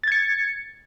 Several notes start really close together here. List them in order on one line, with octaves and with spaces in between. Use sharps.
A6 G#6 C#7